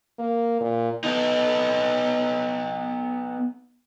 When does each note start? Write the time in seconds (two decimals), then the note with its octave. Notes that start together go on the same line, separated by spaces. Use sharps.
0.19 A#3
0.61 A#2
1.04 B3 D#4